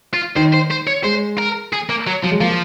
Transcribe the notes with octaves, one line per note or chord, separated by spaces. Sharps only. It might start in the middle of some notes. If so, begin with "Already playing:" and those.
F4
D#3 C5
C5
C5
C#5
G#3 C5
A#4
G#4
A#3
F#3
F3 F#3
G#3
F3 A#3